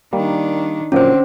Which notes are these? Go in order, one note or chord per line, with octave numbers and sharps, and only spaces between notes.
D#3 G3 A#3 D4
A#2 D3 F3 F#3 C4 C#4 C5